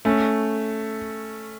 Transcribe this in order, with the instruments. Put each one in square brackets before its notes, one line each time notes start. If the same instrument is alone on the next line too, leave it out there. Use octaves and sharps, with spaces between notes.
[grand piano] A3 C#4